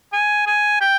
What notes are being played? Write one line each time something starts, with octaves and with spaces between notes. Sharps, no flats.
G#5
G#5
G5